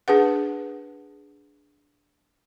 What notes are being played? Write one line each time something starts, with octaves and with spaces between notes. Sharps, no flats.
D4 G#4 B4 F#5